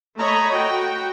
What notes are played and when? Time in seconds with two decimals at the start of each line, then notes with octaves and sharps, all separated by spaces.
0.17 A3 C#5 D#5 A#5 B5
0.52 F#4 G5